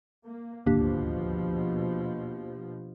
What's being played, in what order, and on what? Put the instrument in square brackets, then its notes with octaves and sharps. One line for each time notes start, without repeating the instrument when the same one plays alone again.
[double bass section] A#3
[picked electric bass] D#1 G#1 D2 [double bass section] B2 F3 [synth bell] A#3 D4 G4